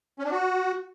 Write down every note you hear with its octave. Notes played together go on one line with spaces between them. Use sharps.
C#4
D4
F#4